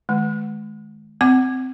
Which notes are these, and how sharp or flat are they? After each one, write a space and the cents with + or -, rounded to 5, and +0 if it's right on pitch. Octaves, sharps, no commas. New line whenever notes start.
D#3 +0 G#3 +30
C4 -15 F#5 +25 D6 +20